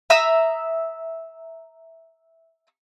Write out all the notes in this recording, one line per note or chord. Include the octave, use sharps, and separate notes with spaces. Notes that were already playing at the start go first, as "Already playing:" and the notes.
E5 A#5 D#6 E6